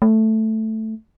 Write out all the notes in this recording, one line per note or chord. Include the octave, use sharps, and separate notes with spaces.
A3